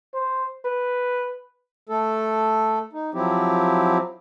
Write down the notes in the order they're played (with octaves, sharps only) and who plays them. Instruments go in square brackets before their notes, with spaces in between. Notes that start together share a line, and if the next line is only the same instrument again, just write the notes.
[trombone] C5
B4
[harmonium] A3 A4
D#4
F3 F#3 C4 E4 G4